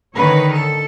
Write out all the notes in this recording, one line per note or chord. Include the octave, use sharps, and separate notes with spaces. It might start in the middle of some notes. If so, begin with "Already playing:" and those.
D3 D#3 B4 C#5
A4